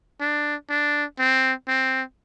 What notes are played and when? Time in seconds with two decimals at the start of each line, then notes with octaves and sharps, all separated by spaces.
0.21 D4
0.70 D4
1.19 C4
1.68 C4